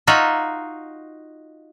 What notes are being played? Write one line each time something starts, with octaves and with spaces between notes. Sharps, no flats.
D#4 F4 F#4 E5